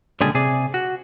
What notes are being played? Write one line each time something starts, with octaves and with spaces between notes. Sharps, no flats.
C#2 A#2 D3 G3 D4 G#4
C3 G#4 D5
F#4